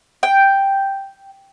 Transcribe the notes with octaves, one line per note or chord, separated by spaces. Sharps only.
G5